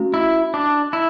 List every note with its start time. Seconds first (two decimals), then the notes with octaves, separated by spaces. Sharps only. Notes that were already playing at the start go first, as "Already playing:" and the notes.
Already playing: A3 C#4 F#4
0.14 E4
0.54 D4
0.93 E4